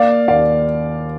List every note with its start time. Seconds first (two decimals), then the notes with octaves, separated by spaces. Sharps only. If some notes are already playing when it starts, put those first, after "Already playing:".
Already playing: A#3 D5 F5
0.28 D#2 D5 F5